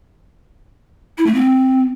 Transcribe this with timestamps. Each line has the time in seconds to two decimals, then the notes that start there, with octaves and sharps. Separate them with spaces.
1.18 E4
1.26 A3
1.35 C4